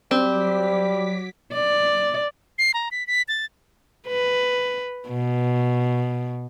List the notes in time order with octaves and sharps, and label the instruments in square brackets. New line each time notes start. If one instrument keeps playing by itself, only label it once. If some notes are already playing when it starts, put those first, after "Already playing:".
[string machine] F#3 D6 B6 [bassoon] G3 [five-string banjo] C4
[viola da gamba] D5
[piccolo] C7
A#5
B6
B6
A6
[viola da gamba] B4
B2